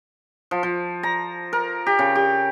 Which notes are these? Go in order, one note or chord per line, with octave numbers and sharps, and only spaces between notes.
F3
F3
A#5
A#4
G4
C#3
G4